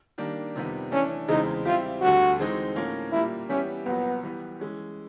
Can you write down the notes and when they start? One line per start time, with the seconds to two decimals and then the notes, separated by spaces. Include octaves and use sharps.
0.18 D#3 G3 A#3 D4
0.55 F2 C3 D#3 G3 B3
0.92 E3 A3 C#4 D4
1.28 E2 C#3 E3 G#3 C4 D#4
1.65 G3 C4 E4 F4 G4
2.01 D2 D3 G3 F#4
2.39 E3 G#3 C4 D#4
2.76 A2 F3 A#3 C#4
3.12 A#2 G3 A#3 E4
3.49 E3 G3 B3 C#4 E4 G4
3.86 C2 A#2 F#3 B3
4.23 E3 G3 B3
4.60 E3 G#3 C#4